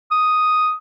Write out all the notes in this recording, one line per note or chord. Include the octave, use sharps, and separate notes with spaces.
D#6